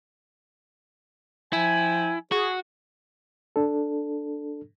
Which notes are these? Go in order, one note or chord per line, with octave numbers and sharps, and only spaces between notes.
F3 E4 G5 G#5
F#4 G#4
D4 A4